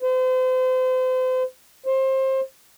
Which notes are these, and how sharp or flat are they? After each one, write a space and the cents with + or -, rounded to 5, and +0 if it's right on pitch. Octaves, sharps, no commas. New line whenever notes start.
C5 -35
C5 +25